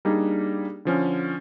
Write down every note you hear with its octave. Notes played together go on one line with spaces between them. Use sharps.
G3 A#3 D4 D#4 G#4
D3 F3 C#4